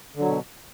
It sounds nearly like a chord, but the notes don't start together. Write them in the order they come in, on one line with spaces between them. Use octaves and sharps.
D3 F#3 B2